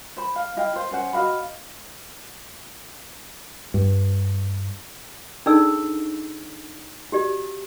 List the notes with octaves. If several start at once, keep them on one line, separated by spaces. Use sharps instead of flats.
C5 B5
F5
E4 D#5 F5 G5
C5
C#4 C5 F#5
F#4 D#5 F5 B5
G2
D4 D#4 G#4 A4 D5 E6
F#4 G4 D5